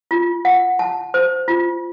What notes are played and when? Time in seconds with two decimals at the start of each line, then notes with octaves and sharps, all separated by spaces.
0.11 F4
0.45 F#5
0.79 A5
1.14 C5
1.48 F4